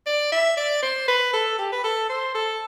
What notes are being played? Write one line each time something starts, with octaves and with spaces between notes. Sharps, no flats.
D5
E5
D5
C5
B4
A4
G4
B4
A4
C5
A4